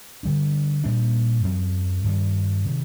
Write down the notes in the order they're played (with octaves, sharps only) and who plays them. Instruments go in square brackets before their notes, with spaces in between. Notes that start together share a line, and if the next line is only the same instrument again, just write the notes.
[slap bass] D3 G3 D4
A#2 G3 A#3 D4
F#2 F#3 C4
G2 D#3 G3
C3 D#3